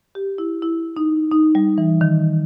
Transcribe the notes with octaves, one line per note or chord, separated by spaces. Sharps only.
G4
E4
E4
D#4
D#4
G3
E3
D#3